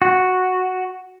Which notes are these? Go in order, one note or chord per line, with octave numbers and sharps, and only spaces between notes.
F#4